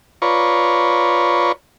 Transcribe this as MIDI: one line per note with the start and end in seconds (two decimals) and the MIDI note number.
0.22 1.52 65
0.22 1.52 71
0.22 1.52 73
0.22 1.52 74
0.22 1.52 82
0.22 1.52 85